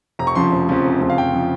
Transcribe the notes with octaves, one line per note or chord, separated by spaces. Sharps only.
F1 A#5
C#6
F2 C#3 F3 C6
F1
F2 C#3 F3
F1
F2 C#3 F3
F5
F1 G5
C#3 F3